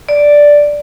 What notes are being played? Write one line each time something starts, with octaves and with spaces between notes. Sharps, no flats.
D5